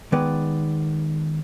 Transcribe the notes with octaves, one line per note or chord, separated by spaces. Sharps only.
D#3 G#3 B3 B4 D5